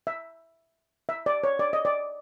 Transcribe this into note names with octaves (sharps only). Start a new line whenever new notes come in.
E5
E5
D5
C#5
D5
D#5
D5